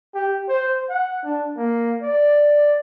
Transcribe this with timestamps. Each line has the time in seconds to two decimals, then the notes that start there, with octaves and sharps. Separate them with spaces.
0.15 G4
0.49 C5
0.89 F#5
1.24 D4
1.57 A#3
2.02 D5